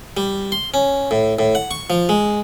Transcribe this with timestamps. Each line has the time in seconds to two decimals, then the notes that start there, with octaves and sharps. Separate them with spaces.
0.17 G3
0.52 C6
0.74 C#4
1.11 A2
1.39 A2
1.55 F#5
1.71 C#6
1.90 F3
2.09 G#3